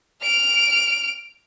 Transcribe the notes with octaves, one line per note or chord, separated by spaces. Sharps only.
F6 D7